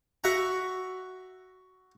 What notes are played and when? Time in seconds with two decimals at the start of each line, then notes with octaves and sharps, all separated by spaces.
0.24 F#4 E5 F#5 A#5